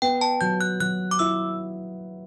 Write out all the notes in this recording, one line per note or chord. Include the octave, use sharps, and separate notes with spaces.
B3 G5
A5
F#3 G6
F#6
F#3 F#6
D6
E4 E6